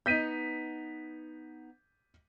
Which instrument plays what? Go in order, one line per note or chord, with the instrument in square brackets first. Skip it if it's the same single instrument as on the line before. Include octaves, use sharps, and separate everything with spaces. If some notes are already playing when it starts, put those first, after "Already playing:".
[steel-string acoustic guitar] B3 D#4 [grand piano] G6 B6 D#7